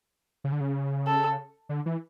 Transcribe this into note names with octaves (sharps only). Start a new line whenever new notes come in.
C#3
D3
C#3
A4
D3
E3